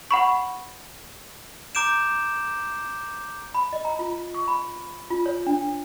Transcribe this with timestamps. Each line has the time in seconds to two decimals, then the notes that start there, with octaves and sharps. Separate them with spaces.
0.11 F#5 B5 C#6
1.75 A#5 D6 G6 D7 E7
3.54 B5
3.73 D#5
3.85 A#5
3.99 F4
4.34 C#6
4.48 B5
5.10 F4
5.26 C#5
5.46 D4